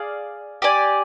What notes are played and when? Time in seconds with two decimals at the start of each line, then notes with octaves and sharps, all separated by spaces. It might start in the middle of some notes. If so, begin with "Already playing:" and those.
Already playing: G#4 D5 F5
0.62 G4 D5 G#5